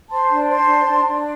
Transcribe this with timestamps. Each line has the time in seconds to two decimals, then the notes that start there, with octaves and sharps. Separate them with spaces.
0.10 C5 A5 C6
0.30 D4
0.49 C5 A5 C6
0.68 D4
0.87 D4
1.06 D4